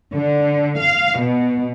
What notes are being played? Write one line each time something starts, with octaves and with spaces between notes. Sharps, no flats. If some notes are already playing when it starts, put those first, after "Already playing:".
D3
F5
B2